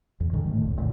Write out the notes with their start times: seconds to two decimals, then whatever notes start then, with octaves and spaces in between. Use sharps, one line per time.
0.20 E2
0.33 G#2 D3 D#3 G#3
0.47 A2 A3
0.61 E1 C2
0.77 F1 A#2 D3